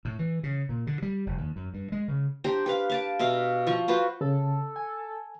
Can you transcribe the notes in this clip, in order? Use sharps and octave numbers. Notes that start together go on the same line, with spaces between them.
A2
E3
C#3
A#2
D3
G3
F1
D#2
F#2
G2
G#3
C#3
D4 G4 C5 A#5
G4 B4 F5
F5 A5 D6
B2 E5 F5 A#5
F3 C#6
F4 F#4 B4 C5
C#3 A4
G#5